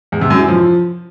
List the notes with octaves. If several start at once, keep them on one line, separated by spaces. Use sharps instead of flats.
E2
C3
F#2
E3
F3